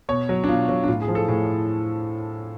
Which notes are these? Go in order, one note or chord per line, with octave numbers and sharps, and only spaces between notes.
B2 C#5
F#3
D4
B2 F4
F#3
D4
A2 F4
G#4
F3
A4
A2 G#4